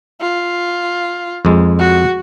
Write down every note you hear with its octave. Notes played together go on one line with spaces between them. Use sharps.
F4
F2 G#3
F#4